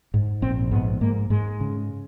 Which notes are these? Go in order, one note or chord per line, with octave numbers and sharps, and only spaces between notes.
G#2
A#1 C4
G#2 B3
G#2 A#3
G#2 G#3
C#3